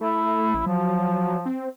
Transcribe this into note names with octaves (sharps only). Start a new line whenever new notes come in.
A3 E4
A1
F3 F#3
C4